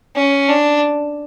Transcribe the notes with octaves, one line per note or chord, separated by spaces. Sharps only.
C#4
D4